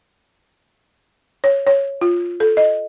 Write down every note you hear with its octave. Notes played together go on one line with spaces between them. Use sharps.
C#5
C#5
F4
A4
D#5